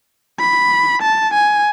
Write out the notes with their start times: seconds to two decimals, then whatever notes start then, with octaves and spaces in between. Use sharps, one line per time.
0.39 B5
1.02 A5
1.34 G#5